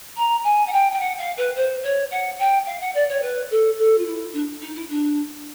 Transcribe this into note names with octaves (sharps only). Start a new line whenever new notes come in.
A#5
G#5
F#5
G5
G5
F#5
F5
B4
C5
C#5
F#5
G5
F5
F#5
D5
C#5
B4
A4
A4
F4
E4
D4
D#4
E4
D4